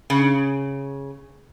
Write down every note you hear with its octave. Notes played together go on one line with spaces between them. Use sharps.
C#3